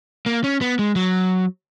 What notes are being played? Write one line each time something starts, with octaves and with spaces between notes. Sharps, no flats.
A#3
C#4
B3
G#3
F#3